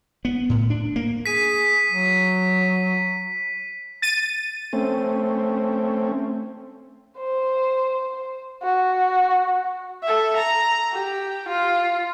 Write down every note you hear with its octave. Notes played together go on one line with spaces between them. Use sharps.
B3
A2
D4
A#3
G#4 B6 D#7
F#3
A6 D#7
A3 C4 C#4
C5
F#4
A4 E5
A#5
G4
F4